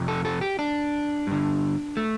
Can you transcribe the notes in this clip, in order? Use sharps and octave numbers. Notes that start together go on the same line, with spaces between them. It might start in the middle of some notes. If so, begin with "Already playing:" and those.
Already playing: F2 C3
A4
A4
G4
D4
G2 D3
A3